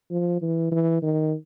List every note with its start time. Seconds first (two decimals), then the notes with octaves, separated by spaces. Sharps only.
0.11 F3
0.42 E3
0.72 E3
1.02 D#3